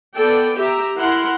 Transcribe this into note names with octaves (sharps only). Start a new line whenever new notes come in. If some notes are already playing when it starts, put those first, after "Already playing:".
B3 A4 D5 G5
G4 E5 A#5
E4 A#4 F#5 C6